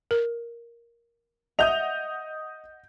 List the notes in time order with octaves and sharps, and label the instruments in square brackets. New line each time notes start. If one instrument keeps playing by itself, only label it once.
[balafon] A#4
[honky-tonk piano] D#5 F#5 [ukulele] E5 [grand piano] D#6 G6 F7